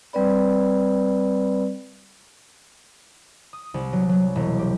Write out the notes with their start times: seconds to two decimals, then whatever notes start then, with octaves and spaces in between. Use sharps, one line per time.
0.13 G3 C4 B4 D5 B5
3.53 D#6
3.74 C2
3.93 F#3
4.09 F#3
4.35 E1
4.59 G4